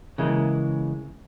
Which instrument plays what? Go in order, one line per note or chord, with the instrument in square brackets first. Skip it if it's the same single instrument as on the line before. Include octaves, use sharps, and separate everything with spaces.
[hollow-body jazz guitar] C#3 E3 G#3 A#3